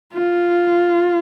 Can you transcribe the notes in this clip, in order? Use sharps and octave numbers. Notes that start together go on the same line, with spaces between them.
F4